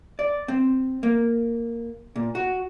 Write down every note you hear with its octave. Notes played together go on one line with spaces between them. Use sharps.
D5
C4
A#3
A#2
F#4